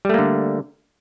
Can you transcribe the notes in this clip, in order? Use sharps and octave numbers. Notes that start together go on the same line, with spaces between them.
D3 G3 A3 A#3